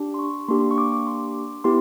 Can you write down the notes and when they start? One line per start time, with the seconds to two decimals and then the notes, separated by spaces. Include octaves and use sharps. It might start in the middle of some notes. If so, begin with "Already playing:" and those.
Already playing: D4 G4
0.14 C6
0.19 C#6
0.48 A#3 D4 G4 C6
0.71 C#6
0.78 D6
0.92 D6
1.07 C6
1.64 B3 E4 G4 C6